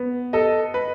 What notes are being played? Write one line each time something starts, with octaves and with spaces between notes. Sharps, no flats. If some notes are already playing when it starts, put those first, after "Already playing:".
Already playing: B3
A4 D#5
B4